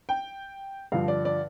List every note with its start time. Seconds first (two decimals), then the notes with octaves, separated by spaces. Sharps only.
0.09 G5
0.92 G2 D3 F3 F5
1.08 D5
1.25 D5